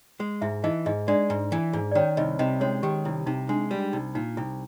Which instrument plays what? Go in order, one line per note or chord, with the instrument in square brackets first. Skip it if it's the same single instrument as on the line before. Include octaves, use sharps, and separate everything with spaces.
[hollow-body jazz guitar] G#3
[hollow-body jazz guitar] G#2 [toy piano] E4 E5
[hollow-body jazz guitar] E3 [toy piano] D#4 D#5
[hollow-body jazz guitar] G#2 [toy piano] D#4 D#5
[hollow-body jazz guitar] G#3 [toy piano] D4 D5
[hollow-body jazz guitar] G#2
E3
G#2
[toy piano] D5
[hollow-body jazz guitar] D#3 [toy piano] C#4 C#5
[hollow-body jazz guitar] C2 [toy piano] D#4 D#5
[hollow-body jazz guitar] C3 [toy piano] D#4 D#5
[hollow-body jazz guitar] G#3 [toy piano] C#4 C#5
[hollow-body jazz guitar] D#3 [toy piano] G4
[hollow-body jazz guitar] C2 [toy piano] E4
[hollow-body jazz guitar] C3 [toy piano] D#4
[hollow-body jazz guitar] G#3 [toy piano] D4
[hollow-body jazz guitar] G3
[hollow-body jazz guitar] C2 [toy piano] D#4
[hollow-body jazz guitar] A#2 [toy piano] D#4
[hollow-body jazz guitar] C2 [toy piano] E4